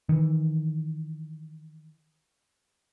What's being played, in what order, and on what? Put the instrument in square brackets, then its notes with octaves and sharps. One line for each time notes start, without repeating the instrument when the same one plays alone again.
[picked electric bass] D#3 E3